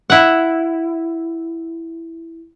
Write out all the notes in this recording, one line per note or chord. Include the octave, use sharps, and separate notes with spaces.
E4 F#5